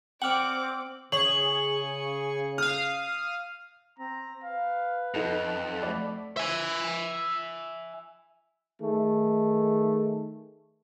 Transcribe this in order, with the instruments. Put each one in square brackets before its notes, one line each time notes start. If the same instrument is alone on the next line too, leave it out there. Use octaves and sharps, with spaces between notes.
[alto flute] C4 [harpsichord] D5 F#5 [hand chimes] G5 F6 [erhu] D6
[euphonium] C#3 [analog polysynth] G#4 C#6 [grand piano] C#5 [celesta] F#7
[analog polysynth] F5 D#6 [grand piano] F6
[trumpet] C4 [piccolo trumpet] A#5
[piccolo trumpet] B4 [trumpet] F5
[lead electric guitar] F2 [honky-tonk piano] D#4 A4 [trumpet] F#5
[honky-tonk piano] A3 D5 [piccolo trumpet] B5
[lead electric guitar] E5 G#5
[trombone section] D#3 A3 G#4